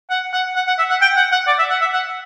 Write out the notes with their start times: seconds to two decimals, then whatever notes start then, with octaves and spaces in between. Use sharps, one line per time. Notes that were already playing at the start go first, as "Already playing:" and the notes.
0.10 F#5
0.33 F#5
0.56 F#5
0.67 F#5
0.79 E5
0.90 F#5
1.02 G5
1.16 F#5
1.32 F#5
1.47 D5
1.59 E5
1.70 F#5
1.81 E5
1.93 F#5